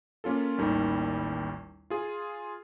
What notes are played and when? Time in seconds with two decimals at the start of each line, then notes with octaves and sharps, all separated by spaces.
0.24 A#3 C#4 F4 A4
0.58 A1 D#2 D#3 G3
1.90 F4 G#4